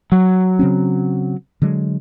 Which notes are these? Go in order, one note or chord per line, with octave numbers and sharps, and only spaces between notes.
F#3
C#3 C4 C#4
D3 F#3 G#3